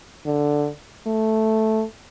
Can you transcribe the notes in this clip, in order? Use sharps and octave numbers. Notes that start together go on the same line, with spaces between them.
D3
A3